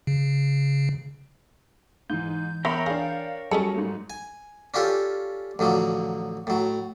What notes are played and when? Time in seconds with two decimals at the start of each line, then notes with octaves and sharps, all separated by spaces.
0.07 C#3
2.10 G#2 E3 G6
2.65 B3 A#4 C#5 E5 G5 A#5 B5
2.86 D4 G#4 F5
3.51 F#3 G3 C#4 G#4 A4 C#7
3.74 G#2 A3
4.10 G#5
4.74 C#4 D4 F4 G4 A4
5.59 A1 D3 F3 F#3
6.47 A2 F#3